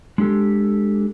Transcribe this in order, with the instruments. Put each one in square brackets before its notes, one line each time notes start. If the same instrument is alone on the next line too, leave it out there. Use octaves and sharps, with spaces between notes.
[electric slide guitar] G#3 D4 G4 A4